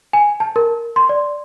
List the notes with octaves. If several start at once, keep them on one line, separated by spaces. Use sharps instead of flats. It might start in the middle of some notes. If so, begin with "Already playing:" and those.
G#5
A5
A#4
C6
D5